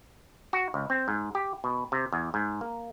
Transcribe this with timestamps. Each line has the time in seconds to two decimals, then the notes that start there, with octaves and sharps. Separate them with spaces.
0.53 F#4
0.74 C#2
0.90 C4
1.08 G#2
1.35 G4
1.64 B2
1.92 C3
2.12 E2
2.34 G#2
2.61 A#3